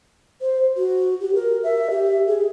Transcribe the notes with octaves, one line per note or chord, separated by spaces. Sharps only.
C5
F#4
G4
A#4
E5
G4
G#4